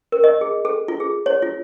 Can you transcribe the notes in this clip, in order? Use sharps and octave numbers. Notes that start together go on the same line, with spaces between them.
A#4
D#5
G#4
A4
F4
G#4
C#5
F4